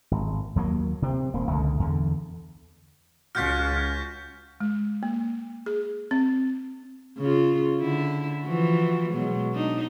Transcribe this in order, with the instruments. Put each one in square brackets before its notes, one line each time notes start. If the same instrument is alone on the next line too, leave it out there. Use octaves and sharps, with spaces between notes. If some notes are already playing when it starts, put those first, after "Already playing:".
[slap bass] G#1
D#2 F#3 A#3
C3 C4
D#1 A#3
C#2 D3
E2 D3
[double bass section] C#2 [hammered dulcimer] C#4 F4 F#4 [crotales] F6 G6 B6
[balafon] G#3
A#3
G#4
C4
[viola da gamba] C#3 F4
D3 E4
E3 F3 F#4
B2 F#3 G#3
D4 D#4